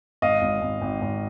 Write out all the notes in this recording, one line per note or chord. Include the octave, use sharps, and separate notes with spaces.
G#1 D#5 F5
G#1
G#1
G#1
G#1